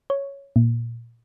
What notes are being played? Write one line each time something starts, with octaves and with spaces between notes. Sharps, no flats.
C#5
A#2